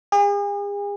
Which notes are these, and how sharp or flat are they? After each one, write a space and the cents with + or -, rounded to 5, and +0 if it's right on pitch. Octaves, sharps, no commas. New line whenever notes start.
G#4 -40